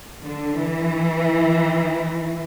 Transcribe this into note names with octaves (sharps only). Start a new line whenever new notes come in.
D3
E3